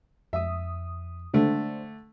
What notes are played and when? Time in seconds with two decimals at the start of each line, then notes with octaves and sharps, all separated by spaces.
0.33 F2 E5 D#6
1.34 D3 A3 D4 C5